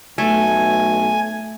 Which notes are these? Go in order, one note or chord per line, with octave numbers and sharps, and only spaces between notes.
B1 A3 G#5